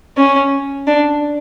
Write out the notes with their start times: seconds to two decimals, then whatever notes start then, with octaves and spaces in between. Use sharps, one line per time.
0.17 C#4
0.87 D4